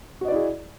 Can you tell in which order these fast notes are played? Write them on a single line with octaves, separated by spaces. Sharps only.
F#4 D#5 D5 E4 G#4